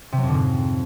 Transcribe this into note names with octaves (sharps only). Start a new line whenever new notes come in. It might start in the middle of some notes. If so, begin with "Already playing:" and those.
C3
F#3
F2
D3
G#2